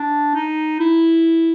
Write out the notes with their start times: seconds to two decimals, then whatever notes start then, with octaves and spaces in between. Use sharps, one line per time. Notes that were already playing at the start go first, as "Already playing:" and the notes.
Already playing: D4
0.35 D#4
0.80 E4